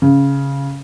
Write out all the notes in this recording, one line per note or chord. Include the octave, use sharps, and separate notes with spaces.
C#3